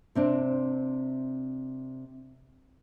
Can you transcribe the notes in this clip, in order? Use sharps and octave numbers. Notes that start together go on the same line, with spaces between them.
C3 C4 D4